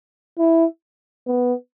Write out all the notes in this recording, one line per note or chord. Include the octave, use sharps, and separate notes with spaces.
E4
B3